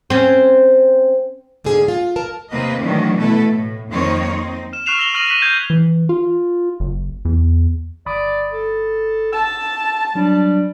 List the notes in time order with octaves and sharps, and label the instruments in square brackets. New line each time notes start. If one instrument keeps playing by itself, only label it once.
[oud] C4 C#4
[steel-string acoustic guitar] G#2 D3 A#3 G#4
F4
A#4 A5
[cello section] D#2 C3 A#3 C4 B4 D#5
D#3 E3 F#3 A3 C#4 D4
B2 A3 E4 A4 B4
A2
F2 D#3 A#3 C4 D#4 C#5
C4 D#4
[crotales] F6 E7
C#6 F6 F#6 C7 E7 F7
E6 A#6 F7 G7
C#6 D#6 F6 A#6 D#7 F#7
C#6 F#6 B6 D#7 E7 F#7
C#6 E6 G6 G#6 B6 C7
[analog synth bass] E3
F4
F#1
E2
[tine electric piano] G1 B5 D#6 [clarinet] D5
[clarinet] A4
[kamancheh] A5 [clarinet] E6
[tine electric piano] F#3 D4 [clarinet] G3